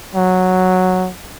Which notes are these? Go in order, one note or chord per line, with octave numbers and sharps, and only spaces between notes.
F#3